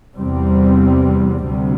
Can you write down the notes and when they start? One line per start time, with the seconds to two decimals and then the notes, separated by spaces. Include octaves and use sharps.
0.16 E2 C3 G3 C4
1.47 D2 C3 G3